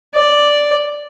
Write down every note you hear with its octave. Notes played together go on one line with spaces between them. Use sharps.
D5